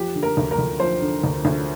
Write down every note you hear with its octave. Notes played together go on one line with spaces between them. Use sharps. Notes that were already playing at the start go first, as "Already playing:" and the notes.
Already playing: F3 G4
D3
A#4
D2
A#4
D2
F3 C5
D3
D2
D2